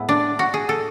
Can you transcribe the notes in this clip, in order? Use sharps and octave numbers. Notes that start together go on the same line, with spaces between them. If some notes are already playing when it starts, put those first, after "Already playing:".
Already playing: A2 G#3 B3 E4
D4
F#4
G#4
A4